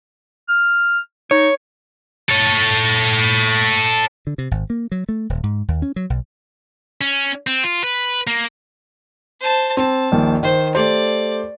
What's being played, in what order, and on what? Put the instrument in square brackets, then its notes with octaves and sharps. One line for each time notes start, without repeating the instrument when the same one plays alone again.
[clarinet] F6
[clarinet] D#4 [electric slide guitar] C#5
[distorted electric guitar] A4 C#5
[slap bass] D3
C3
G#1
A#3
F#3
A3
D#1
G#2
D#2
C#4
F#3
B1
[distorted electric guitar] C#4
C4
F4
B4
A#3
[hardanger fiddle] C5 A5
[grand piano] C4 [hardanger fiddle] A5
[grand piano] A#1 D#2 D#3
[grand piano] D#3 [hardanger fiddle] C5
[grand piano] A3 G4 C5 [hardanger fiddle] D5